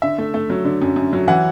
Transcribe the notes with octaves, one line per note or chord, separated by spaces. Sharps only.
D3 E5
A3
A3
F#3
D3
F#2
F#2
F#3
E3 F#5